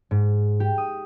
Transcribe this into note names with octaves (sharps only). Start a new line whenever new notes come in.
G#2
G4
D#6